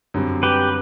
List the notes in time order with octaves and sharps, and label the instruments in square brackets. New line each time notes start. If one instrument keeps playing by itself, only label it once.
[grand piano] F#2 D3 G3 C4
[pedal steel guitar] G4 B4